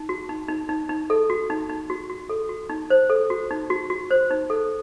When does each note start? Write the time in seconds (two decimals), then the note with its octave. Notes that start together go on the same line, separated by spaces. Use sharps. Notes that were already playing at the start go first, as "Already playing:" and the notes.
Already playing: D#4
0.09 F#4
0.29 D#4
0.49 D#4
0.69 D#4
0.89 D#4
1.10 A4
1.30 F#4
1.50 D#4
1.69 D#4
1.90 F#4
2.10 F#4
2.29 A4
2.49 F#4
2.70 D#4
2.90 C5
3.10 A4
3.30 F#4
3.51 D#4
3.70 F#4
3.90 F#4
4.11 C5
4.31 D#4
4.50 A4